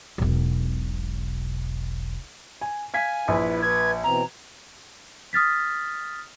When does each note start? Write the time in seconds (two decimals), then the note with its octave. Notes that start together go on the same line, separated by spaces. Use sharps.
0.18 E1 B1
2.61 G#5
2.94 F5 G#5 G#6 B6
3.28 A#1 E4 B4
3.62 B4 G#6
4.03 B2 E3 C4 A#5
5.33 D#6 F6 A6 B6